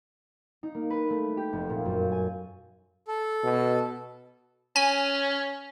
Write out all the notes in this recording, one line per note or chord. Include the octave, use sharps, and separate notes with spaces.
D#4
A#3
B4
A3
G4
F1
A#2
F#2
G#5
A4
B2
C#4 G#5